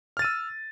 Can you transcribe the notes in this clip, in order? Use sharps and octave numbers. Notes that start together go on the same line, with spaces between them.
E6 F6 A6 D#7